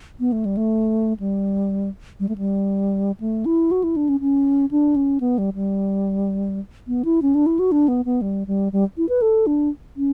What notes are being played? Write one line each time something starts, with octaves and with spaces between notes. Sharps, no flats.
B3
A3
G3
A3
G3
G3
A3
G3
A3
E4
F#4
E4
D4
C#4
C#4
D4
C#4
B3
G3
G3
B3
E4
C#4
D4
E4
F#4
D4
B3
B3
G3
G3
G3
E4
B4
A4
D4
C#4